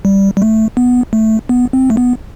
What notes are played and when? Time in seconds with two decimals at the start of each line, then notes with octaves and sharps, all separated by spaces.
0.05 G3
0.37 G3
0.42 A3
0.77 B3
1.13 A3
1.49 B3
1.73 C4
1.90 A3
1.97 B3